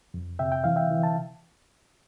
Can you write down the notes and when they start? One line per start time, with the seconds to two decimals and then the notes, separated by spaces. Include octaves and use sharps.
0.14 F2
0.39 C3 E5 G5
0.52 G5
0.64 E3 F5
0.76 E5 G5
0.90 E3
1.03 A5